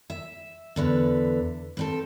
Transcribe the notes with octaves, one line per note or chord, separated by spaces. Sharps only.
E5
E2 D3 B4
G2 C4 A4